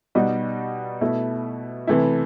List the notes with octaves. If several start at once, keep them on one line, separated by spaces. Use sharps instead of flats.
B2 G3 D#4 F#4
B2 A3 E4
C3 E3 A3 E4